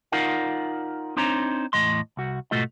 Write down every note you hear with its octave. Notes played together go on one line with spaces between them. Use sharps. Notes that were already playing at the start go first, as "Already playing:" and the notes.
D#4 F4 A#4 D5 F5 F#5
C4 D4 D#4 C5 C#5 A#5
E2 A2 D#3 D#5 C6
C2 F#4
G#2 B2 A3 F4 F#4 D#5